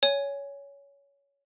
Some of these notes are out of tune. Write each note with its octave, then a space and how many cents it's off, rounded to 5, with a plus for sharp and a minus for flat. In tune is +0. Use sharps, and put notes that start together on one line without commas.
C#5 +20 G#5 +0